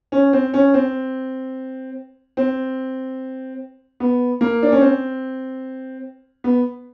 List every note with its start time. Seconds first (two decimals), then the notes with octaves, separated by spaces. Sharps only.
0.12 C#4
0.33 C4
0.54 C#4
0.74 C4
2.37 C4
4.00 B3
4.41 A#3
4.63 D4
4.72 C#4
4.81 C4
6.44 B3